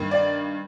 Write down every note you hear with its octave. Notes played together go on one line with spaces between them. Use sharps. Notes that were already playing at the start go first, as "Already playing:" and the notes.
Already playing: G2 D#3 A#3
D5